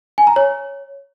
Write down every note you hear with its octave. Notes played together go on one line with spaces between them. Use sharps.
G#5
A#5
C#5